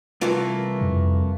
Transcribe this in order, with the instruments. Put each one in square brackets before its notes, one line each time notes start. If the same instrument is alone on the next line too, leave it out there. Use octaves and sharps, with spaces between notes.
[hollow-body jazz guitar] C2 F4 [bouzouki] E3 A3 A#3
[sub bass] F2